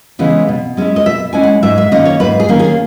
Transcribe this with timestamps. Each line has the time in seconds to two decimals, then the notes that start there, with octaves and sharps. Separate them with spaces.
0.19 C#3 E3 G#3 B3
0.49 B2
0.77 G#3 C#4 E4
0.96 D#5
1.05 B2 E5
1.33 G#3 C#4 E4 G#5
1.43 F#5
1.63 G#2 E5
1.78 E5
1.91 D#3 A#3 C#4 D#5
2.05 C#5
2.20 G#2 B4
2.40 G#4
2.49 D#3 A#3 C#4
2.59 G#4